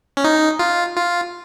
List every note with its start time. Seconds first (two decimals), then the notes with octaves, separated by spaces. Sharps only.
0.17 C#4
0.24 D#4
0.59 F4
0.96 F4